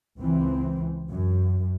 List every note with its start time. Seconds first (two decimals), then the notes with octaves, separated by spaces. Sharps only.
0.19 C#2 E3 C4
1.10 F#2